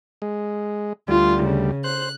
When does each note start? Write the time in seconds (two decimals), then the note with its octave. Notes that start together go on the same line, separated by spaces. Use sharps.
0.22 G#3
1.08 D2 G3 F4
1.43 C#3
1.84 C5 F#6